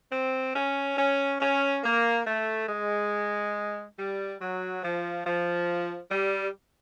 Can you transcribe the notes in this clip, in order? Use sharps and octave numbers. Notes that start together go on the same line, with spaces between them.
C4
C#4
C#4
C#4
A#3
A3
G#3
G3
F#3
F3
F3
G3